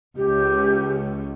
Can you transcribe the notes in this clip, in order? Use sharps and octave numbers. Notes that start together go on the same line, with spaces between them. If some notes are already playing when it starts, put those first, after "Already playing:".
C#2 G4